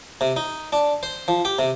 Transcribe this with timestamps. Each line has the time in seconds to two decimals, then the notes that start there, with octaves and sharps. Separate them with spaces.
0.21 C3
0.36 D#4
0.73 D4
1.03 C5
1.28 F3
1.45 G4
1.59 C3